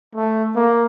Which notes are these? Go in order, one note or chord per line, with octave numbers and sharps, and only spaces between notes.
A3
A#3